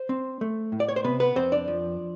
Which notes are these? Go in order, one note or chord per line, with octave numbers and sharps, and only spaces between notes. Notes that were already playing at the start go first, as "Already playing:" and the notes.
Already playing: C5
C4
A3
A2
D5
C#5
C5
C3 B3 B4
B3 B4
F2 C4 C5
D4 D5
F3